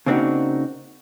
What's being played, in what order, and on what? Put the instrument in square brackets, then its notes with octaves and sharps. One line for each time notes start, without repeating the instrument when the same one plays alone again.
[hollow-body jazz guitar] C#3 A#3 C4 D4 D#4 F#4